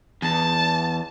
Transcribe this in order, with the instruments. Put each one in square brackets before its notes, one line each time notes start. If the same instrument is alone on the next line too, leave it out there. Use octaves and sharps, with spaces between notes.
[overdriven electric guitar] E2 [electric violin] A5